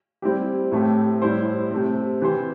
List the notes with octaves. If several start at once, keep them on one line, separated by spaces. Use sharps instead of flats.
G3 C4 E4 G4
A2 A3 C4 G4
A2 G3 E4 C5
C3 A3 C4
C3 E3 C4 G4 C5